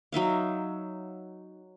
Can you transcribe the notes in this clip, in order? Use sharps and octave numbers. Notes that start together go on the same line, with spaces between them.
F#3 D#4 E5 F5